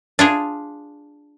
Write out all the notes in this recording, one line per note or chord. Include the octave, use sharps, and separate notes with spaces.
D4 F4 G#4